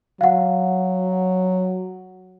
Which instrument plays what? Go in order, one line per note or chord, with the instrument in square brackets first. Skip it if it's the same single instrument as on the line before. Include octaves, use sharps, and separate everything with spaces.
[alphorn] F#3 [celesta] F5 F#5